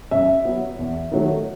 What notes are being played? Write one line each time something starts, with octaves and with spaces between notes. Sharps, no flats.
F#2 E5
F#3 B3
E2
D#3 F#3 A3